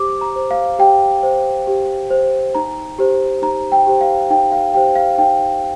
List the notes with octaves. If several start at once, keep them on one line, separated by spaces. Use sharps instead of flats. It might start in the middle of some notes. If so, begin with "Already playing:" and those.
Already playing: G4 C5 D6
A#5
C5
F5
G4 G5
C5
G4
C5
D#4 A#5
G4 C5
D#4 A#5
G5
G4 C5
F5
D#4 G5
F5
G4 C5 G5
F5
D#4 G5